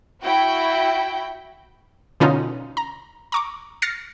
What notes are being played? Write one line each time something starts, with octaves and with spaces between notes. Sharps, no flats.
E4 F#4 G5
B2 D3 C#4 D#4 F4
A#5
A#5 C#6 D6
F6 A6 A#6 C7 C#7